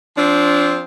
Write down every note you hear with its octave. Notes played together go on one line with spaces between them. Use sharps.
F3 C4 D4